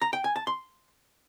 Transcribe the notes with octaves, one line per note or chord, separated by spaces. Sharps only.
A#5
G5
G#5
A5
C6